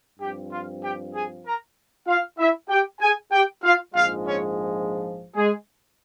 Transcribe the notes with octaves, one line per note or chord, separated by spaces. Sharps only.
G2 F3 C4 G4 G5
F4 F5
G4 G5
G#4 G#5
A#4 A#5
F4 F5
E4 E5
G4 G5
G#4 G#5
G4 G5
F4 F5
A#1 G#2 F3 G#3 F4 F5
C#4 C#5
G#3 G#4